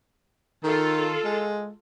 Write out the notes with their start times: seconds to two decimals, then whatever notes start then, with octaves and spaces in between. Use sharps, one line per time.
0.64 D#3 F4 A4
1.25 G#3